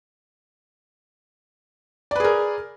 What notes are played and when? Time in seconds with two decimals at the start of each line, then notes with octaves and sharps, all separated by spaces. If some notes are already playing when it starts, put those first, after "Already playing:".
2.11 D5
2.16 B4
2.20 G#4
2.24 A#4